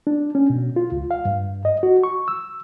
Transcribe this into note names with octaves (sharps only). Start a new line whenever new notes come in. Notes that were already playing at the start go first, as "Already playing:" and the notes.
D4
C#4
B2
F4
C#2
F5
G2
D#5
F#4
C#6
E6